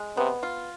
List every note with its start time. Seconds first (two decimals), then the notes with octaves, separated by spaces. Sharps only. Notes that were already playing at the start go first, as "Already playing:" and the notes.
Already playing: G#3
0.17 C3 B3
0.43 F4